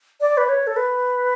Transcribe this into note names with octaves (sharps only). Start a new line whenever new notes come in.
D5
B4
C#5
A4
B4